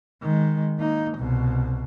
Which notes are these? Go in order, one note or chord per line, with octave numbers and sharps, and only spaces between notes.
D#3 G#3
A#3 D#4
C2 B2